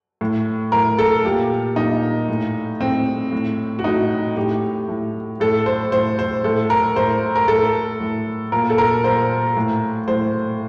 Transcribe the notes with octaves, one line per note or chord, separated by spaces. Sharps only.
A2
A2 A#4
A4
A#2 G4
A#2 D#4
A2
A2 C4
A2
F#4
A2 D#4
A2 G4
A2
A2 A4
C5
A2 C5
C5
A2 A4
A#4
A2 C5
A#4
A2 A4
A2
A#2 A#4
A4
A#4
A#2 C5
A2
A2 C5